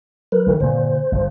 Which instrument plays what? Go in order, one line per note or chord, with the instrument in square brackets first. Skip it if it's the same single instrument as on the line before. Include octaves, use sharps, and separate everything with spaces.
[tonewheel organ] F#3 A#4 B4
[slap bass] D#3 E3
[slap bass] G2 A#2 D3 [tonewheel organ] C5
[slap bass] G1 B2 F3